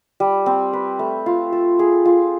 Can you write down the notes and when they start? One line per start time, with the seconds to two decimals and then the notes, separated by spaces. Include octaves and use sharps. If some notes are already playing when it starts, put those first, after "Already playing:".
0.20 G3
0.46 C4
0.73 B4
0.99 A3
1.26 F4
1.52 A4
1.79 G#4
2.05 F4